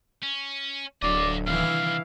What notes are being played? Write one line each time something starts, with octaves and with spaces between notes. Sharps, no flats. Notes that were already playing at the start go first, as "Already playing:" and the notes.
C#4
D1 D3 F#3 D5 D#5 F5
C2 D#3 E3 E4 F5